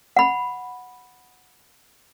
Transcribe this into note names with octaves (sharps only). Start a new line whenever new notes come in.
F#5 B5